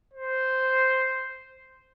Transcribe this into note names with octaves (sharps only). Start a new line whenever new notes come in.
C5